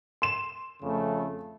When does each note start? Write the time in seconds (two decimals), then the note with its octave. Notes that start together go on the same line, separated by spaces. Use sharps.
0.22 C6 E7
0.82 F2 C#3 A3